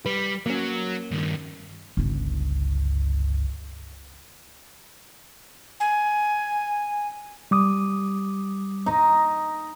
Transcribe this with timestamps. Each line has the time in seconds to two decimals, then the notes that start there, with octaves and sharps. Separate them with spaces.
0.06 G3 B4
0.46 F#3 A#3 C#4
1.11 G2 D#3
1.97 G1 C#2
5.80 G#5
7.51 G3 D6 D#6
8.86 D#4 D#5